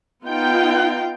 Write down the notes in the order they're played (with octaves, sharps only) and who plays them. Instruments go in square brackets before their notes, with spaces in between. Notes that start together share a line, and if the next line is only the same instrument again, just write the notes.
[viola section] B3 D#4 F4 G5